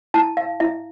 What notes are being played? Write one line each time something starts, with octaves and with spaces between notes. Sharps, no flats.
E4 A5
F5
E4 E5